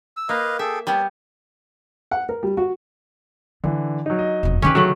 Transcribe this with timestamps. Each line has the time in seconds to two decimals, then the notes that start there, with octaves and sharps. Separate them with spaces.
0.17 E6
0.29 A#3 B4 D#5 F5
0.59 G#4 A4 E5 G5
0.87 G3 B3 C#5 A5
2.11 F#5
2.29 A#4
2.43 G3
2.57 F#4
3.64 D3 E3 D4
4.06 F#3 D#4
4.19 D#5
4.43 E1 F2
4.62 D3 D#3 C#4 G4 B4
4.75 C#3 F#3 A3 E7 F#7